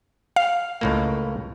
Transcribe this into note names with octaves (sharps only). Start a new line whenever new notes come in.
F5
C#2 A2 A#3